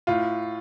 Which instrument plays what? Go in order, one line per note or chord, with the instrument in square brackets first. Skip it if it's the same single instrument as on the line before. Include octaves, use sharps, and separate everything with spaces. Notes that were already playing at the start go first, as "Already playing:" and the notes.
[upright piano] A2 F4